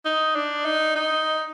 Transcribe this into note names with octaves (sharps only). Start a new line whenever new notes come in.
D#4
D4
D#4
D#4